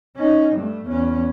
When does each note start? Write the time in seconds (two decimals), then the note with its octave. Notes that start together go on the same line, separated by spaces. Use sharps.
0.17 C#4 D#4
0.55 G2 A3
0.86 E2 C#4